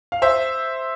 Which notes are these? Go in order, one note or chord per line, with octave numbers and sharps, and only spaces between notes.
F5
C5 E5